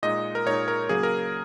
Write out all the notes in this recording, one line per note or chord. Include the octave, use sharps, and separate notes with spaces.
A#2 G#3 D#4 D#5
A#4
A#2 G#3 D#4 C#5
A#4
C#3 F#3 A#3 G#4
A#4